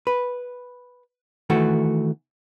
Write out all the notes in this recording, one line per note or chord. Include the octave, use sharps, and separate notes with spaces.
B4
D#3 E3 A3 F#4